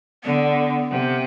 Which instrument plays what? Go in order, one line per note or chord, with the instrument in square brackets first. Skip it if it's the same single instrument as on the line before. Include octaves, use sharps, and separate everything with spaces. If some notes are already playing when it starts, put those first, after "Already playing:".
[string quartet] D3 [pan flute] B3
[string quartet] C3